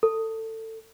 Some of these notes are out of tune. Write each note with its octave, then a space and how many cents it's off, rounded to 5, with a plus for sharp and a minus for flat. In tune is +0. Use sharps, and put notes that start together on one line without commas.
A4 +20